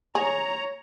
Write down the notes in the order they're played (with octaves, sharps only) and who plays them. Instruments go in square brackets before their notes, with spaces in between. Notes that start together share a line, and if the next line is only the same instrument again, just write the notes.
[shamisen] G#4 [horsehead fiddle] C#5 [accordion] A#5